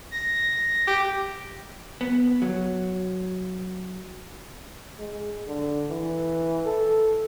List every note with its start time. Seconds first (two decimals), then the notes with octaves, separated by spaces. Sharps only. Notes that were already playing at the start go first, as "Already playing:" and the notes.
0.11 A#6
0.87 G4 D6
2.01 B3
2.42 F#3
4.99 G#3
5.47 D3
5.90 E3
6.66 A4